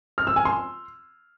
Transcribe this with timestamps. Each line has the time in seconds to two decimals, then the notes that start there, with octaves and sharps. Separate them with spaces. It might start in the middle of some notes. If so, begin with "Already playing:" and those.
0.18 F6
0.27 E6
0.36 G#5
0.45 C6